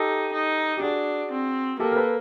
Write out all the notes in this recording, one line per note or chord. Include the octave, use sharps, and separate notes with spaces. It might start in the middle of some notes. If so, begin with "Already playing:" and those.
Already playing: D#4 G4 A4
D#4
G4
D4 F#4 G#4
C4
A#3 G4 A4
A#4
A4 B4